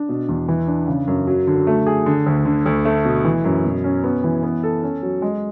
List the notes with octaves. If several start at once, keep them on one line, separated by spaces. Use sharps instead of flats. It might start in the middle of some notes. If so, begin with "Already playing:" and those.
Already playing: D4
B2
E2
E3
D4
C#3
F#2
F#3
D3
A3
G#4
D3
D2
D3
D2
A3
B2
E3
F#2
B2
C#4
B3
E3
B3
A4
C#4
F#3
G#3